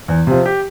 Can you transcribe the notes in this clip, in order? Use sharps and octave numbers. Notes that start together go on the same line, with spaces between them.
E2
C3 F3
G4